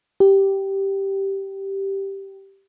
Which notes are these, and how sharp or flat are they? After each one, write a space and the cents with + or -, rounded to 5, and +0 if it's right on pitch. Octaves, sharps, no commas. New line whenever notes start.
G4 -5